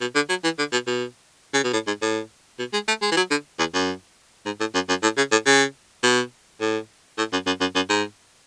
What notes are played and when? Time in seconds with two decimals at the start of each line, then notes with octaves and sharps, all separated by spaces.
0.01 B2
0.15 D3
0.29 F#3
0.44 E3
0.59 D3
0.72 B2
0.87 B2
1.54 C#3
1.64 B2
1.73 A2
1.87 G#2
2.02 A2
2.59 B2
2.73 G#3
2.88 A3
3.02 G#3
3.12 E3
3.17 F#3
3.31 D3
3.59 E2
3.74 F#2
4.45 G#2
4.60 A2
4.74 F#2
4.89 F#2
5.03 A2
5.17 C#3
5.31 A2
5.46 C#3
6.03 B2
6.61 A2
7.18 A2
7.32 F#2
7.46 F#2
7.60 F#2
7.75 F#2
7.89 G#2